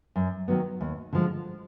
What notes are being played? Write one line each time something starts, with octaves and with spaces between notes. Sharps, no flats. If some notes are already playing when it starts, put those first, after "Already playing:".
F#2
D#3 F#3 B3
D#2
D3 F3 G#3